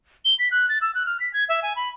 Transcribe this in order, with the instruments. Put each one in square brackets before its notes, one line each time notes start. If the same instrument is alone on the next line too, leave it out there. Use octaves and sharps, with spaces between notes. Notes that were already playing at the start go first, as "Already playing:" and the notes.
[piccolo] G7
B6
F#6
A6
E6
F#6
F6
B6
G#6
E5
G#5
B5